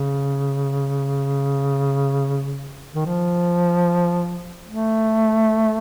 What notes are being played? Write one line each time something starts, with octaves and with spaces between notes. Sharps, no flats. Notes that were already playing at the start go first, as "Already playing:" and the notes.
Already playing: C#3
D#3
F3
A3